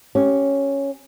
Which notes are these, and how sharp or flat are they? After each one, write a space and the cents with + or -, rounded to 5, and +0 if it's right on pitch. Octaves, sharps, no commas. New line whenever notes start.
C#4 +0 G4 -10